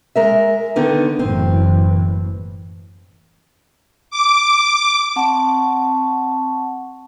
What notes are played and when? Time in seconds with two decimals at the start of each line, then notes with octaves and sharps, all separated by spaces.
0.15 G#3 A#4 E5
0.76 D3 D#3 B3
1.19 F#1 A2 E3 C4
4.11 D6
5.16 C4 F#5 A5 C#6